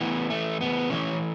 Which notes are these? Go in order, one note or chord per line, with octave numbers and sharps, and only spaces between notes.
A2 E3 B3
A3
B3
A2 E3 C#4